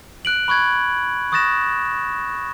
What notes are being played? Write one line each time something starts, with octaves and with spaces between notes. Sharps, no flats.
F#6 D7 F#7
B5 C#6 F#6 G#6
C#6 D#6 F#6 A6 A#6 E7